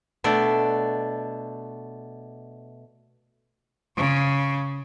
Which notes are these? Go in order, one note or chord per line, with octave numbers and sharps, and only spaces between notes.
B2 A3 D4 D5
C#3